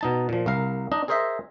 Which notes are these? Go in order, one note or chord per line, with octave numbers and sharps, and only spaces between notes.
B2 D#4 A5
A#2 F3
C2 A#4 F5
D4 D#4 D#5
G#4 A#4 C5 D#5 E5